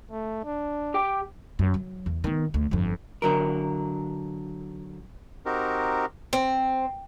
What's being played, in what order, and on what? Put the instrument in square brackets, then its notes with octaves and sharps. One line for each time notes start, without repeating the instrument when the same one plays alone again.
[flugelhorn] A3
D4
[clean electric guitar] G4 G5
[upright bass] F#2
F#3
E2
D#3 B3
D2
G1 F2
[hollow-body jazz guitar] D3 F#3 A#4
[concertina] C4 D#4 F#4 G4 A#4
[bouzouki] C4